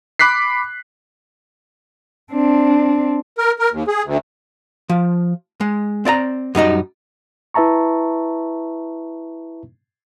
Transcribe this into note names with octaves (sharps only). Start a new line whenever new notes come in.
B5 D6 F#6 B6 C7
C4 D4
A#4
A#4
D#2
G#4
D2
F3
G#3
C4 D5 E5 A#5
F#2 G3 D#4 D#5
E4 B4 E5 A5 A#5 C#6